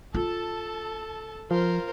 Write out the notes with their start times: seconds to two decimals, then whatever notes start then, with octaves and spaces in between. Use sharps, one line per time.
0.14 F4 A4 A5
1.51 F3 F4 A#4 C5